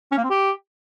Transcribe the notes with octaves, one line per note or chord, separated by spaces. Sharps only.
C#4
A#3
C4
G4